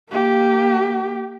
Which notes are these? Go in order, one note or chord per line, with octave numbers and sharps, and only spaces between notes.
A#3 G4